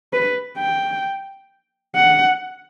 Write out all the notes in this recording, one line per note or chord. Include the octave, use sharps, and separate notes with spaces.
B4
G5
F#5